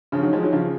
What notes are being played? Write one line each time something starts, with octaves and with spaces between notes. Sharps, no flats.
C#3 F3
D#3 F#3
F3 G#3
D#3 F#3
C#3 F3